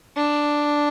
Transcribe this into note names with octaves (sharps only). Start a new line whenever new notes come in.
D4